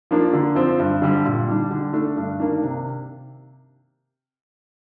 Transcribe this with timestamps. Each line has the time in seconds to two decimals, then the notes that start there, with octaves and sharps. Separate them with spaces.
0.11 F3 A#3 D4
0.33 D3
0.55 F3 C4
0.80 G2
1.02 D3 G3
1.25 A#2
1.48 G3 D4
1.71 D3
1.93 A3 D4
2.17 G2
2.40 D#3 A#3 D4
2.63 C3